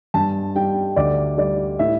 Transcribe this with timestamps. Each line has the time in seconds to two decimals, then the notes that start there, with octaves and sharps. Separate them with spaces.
0.14 G2 A5
0.55 G3 G5
0.96 D2 D5
1.37 G3 D5
1.79 A2 E5